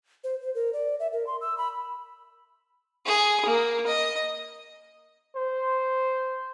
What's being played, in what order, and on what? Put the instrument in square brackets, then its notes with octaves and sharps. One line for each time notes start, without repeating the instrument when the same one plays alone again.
[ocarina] C5
C5
A#4
D5
E5
A#4
C6
E6
B5
[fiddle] G#4
A#3
D#5
[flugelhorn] C5